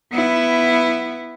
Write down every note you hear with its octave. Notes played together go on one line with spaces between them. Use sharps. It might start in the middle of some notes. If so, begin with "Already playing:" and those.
B3 E4